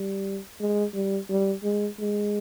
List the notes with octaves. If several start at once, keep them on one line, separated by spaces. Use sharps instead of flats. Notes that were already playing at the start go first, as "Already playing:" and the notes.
Already playing: G3
G#3
G3
G3
G#3
G#3